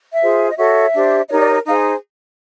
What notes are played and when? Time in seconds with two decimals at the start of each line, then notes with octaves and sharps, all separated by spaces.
0.12 E5
0.21 F4 G#4 C5
0.49 D#5
0.57 F#4 A4 C#5 E5
0.93 D4 G4 C5
1.29 D#4 G4 A#4 C#5 D#5
1.39 D5
1.48 C#5
1.65 D#4 G#4 C5 F5